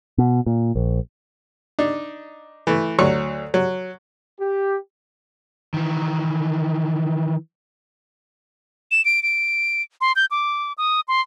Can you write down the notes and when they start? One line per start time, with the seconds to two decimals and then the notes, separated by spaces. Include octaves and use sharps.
0.18 B2
0.46 A#2
0.76 A#1
1.79 D4 D#4
2.67 E3 A3
2.99 D2 F#3 C#6
3.54 F#3
4.40 G4
5.74 D#3 E3
8.91 E7
9.05 D7
9.23 D7
10.01 C6
10.16 G6
10.31 D6
10.78 D#6
11.08 C6